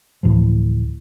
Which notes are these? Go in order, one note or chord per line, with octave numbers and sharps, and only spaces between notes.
D2 A2 E3 F3